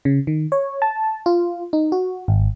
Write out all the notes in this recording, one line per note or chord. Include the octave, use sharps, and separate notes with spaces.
C#3
D#3
C#5
A5
F4
D#4
F#4
G#1